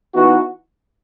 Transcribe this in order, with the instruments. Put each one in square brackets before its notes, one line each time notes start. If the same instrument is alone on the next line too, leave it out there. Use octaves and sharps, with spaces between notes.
[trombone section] E3 B3 D#4 F#4